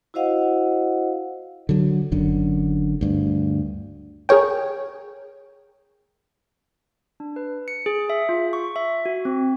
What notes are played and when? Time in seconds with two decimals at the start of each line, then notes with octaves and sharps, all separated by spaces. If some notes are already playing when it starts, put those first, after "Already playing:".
0.14 E4 F#4 C5 D#5 F5 F#5
1.69 D3 F#3
2.12 F#1 F#2 D3
3.01 D2 G2
4.29 G#4 A#4 C#5 G5
7.20 D4
7.36 B4
7.68 C#7
7.86 G#4
8.10 E5
8.29 F4
8.53 C#6
8.76 E5
9.06 F#4
9.25 C4